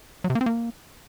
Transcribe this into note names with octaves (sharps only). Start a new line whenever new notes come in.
F#3
C3
A#3
C4
A#3